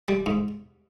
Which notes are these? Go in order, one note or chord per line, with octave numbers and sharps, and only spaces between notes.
G3
G#2